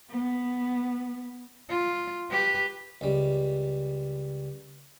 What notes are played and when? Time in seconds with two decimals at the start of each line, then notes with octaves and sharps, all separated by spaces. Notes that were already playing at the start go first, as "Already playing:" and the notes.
0.10 B3
1.69 F4
2.31 G4 B4
3.01 C#2 G3